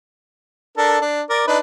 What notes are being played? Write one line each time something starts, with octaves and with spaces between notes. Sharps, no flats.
D4 A4 A#4
D4
A#4 D5
D4 D#4 B4